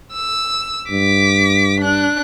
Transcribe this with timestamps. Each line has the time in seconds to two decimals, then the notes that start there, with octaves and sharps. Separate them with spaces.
0.13 E6
0.91 G2 D6 B6
1.81 D4 F#6